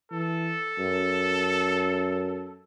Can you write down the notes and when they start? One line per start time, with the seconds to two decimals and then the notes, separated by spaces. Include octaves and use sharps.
0.11 E3 A4
0.78 F#2